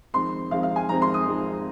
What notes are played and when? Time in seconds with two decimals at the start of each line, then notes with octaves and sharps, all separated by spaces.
0.14 F2 D#3 G#3 C4 C6
0.51 F2 D#3 G#3 C4 F5
0.63 F5
0.76 G#5
0.89 F2 D#3 G#3 C4 A#5
1.02 C6
1.14 D#6
1.27 F2 D#3 G#3 C4